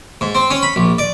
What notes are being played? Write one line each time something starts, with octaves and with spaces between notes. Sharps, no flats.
G#2
C4
C#4
B5
A#1
D5